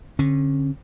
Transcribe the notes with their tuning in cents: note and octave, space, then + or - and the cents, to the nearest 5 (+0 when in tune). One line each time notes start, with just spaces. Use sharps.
D3 -20 C#4 -35